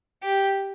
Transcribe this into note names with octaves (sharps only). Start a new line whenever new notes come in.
G4